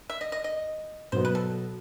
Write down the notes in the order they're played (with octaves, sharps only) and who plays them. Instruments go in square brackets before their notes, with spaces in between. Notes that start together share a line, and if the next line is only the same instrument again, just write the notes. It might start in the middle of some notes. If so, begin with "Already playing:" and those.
[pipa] E5
D#5
D#5
D#5
[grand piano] B2 F#3 B3 [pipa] C5
[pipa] B4
A4